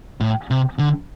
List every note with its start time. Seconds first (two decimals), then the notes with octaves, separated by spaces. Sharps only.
0.20 A2
0.51 C3
0.79 D3